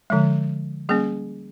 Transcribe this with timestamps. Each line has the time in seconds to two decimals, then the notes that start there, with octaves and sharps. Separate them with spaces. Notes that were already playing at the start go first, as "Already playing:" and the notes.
0.10 D3 F3 G#3
0.89 G3 A#3 C#4 G#4